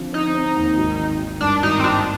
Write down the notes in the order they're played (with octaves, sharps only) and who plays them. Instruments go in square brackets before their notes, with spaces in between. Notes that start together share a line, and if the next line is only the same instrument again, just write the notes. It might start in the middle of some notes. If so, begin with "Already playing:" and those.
Already playing: [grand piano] D3 F3 C4
[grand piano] C4 [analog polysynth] D#4
[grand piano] C4
D#2
G#1
D#3
D#3
[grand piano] G2 [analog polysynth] D4
[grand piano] G#1 [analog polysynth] D#4
[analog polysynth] C4
[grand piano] G#1 [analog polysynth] D4